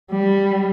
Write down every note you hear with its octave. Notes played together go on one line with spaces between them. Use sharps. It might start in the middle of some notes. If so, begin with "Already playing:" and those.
G3